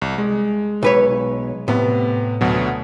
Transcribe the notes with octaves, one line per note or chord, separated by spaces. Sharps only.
C2
G#3
B1 B4 C#5
A2 C3 B3
D2 B2 F#3